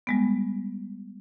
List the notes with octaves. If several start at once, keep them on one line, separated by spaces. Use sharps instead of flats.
G3 G#3 B3